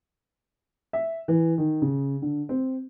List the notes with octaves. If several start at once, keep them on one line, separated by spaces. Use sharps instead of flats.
E5
E3
D#3
C#3
D3
C4